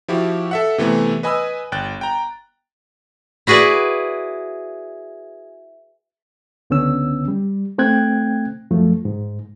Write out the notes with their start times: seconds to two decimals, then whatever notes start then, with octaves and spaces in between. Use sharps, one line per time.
0.08 F3 E4 F#4 G4
0.51 A4 E5 F#5
0.78 C3 E3 A3 B3
1.23 B4 D#5 G#5 B5 D#6 E6
1.72 G1 G5 F#6 A6
2.01 G5 A#5
3.47 E4 F#4 G#4 B4 D5
6.70 C#2 D3 B3 C#4 E6
7.28 G3
7.78 A3 C4 G5 F#6 G#6
8.71 F#2 F3 A3
9.05 G#2